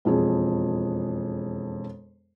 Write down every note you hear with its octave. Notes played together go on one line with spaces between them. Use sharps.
E1 F2 G#4